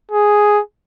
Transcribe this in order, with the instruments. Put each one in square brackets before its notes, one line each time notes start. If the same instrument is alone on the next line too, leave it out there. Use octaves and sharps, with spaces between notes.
[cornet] G#4